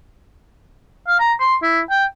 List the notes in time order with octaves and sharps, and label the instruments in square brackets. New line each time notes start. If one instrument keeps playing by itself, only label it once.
[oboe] F5
A#5
C6
E4
G5